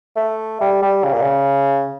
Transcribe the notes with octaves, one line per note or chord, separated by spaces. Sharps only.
A3
G3
G3
C#3
A#2
C#3